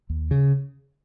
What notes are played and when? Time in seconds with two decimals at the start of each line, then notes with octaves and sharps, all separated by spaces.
0.09 D#2
0.31 C#3